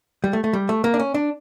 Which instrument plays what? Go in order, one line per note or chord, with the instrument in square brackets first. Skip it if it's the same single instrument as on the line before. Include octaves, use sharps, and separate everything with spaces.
[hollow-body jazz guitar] G3
A3
A3
G3
A3
A#3
D4
C#4
D4